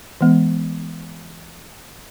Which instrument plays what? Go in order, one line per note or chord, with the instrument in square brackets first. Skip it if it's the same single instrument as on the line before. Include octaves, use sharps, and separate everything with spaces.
[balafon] E3 G#3 B3